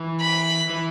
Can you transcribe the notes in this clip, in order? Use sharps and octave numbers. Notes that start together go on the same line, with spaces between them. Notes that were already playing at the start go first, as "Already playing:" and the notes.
Already playing: E3
B5
E3